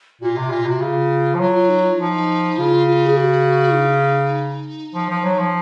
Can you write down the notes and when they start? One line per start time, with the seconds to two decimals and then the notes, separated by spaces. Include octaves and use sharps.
0.21 A#2 F#4
0.26 F4
0.37 C3
0.51 A#2
0.66 C3 F#4
0.80 C#3 F4
1.34 F3
1.39 F#3 F4
1.55 F4
1.69 D#4
1.84 F4
1.99 F3 D#4
2.58 C#3 F4
2.87 F4
3.07 G#4
3.17 F#4
3.76 D#4
4.94 F3
5.10 F3
5.24 F#3
5.39 F3